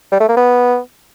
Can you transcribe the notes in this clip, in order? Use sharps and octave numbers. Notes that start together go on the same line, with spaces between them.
G3
A3
A#3
B3